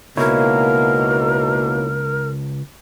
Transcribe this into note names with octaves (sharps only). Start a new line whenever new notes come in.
C#2 B2 A#3 D#4 E4 A#4 C#5